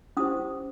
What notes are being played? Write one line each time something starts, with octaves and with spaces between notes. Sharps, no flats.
C#4 E4 G4 C5 D#6